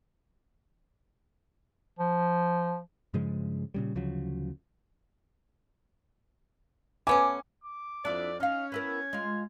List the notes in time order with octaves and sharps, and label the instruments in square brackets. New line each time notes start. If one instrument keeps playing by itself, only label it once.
[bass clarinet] F3
[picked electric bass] G2 C#3 F3 G#3
A#2 C#3 G3
D2 C#3 F3 F#3
[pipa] A3 B3 C#4 [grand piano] G#5 [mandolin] D6
[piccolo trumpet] D6
[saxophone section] F2 D5 [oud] D4 E4
[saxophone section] C#4 [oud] D#4 F5 [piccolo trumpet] F6
[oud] B3 E4 A#4 [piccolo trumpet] G#6
[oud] G#3 F4